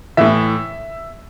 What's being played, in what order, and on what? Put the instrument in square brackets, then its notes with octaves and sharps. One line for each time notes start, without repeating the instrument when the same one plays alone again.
[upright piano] A2 E3 E5